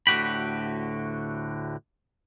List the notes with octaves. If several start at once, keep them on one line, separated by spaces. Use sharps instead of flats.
D2 A2 D3 F#4 G4 B5